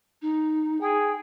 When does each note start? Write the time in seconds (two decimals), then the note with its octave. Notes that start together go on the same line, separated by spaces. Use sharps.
0.22 D#4
0.81 G#4 G5